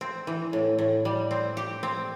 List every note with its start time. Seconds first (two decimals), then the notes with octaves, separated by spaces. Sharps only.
0.01 C4
0.27 E3
0.53 A2
0.79 A2
1.05 G3
1.31 C4
1.57 G4
1.83 C4